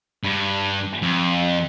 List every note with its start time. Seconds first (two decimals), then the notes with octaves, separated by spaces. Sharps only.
0.23 G2
1.02 F2